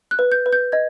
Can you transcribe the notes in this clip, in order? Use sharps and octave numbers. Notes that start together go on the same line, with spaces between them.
F#6
B4
G6
B4
G6
D#5 G#6